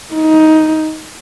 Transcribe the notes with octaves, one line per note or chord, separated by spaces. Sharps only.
D#4